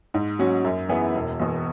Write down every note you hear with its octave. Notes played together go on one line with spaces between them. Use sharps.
G#2
F#3 C#4 F#4
F#2
E3 B3 E4 G#4
E1
E2 B2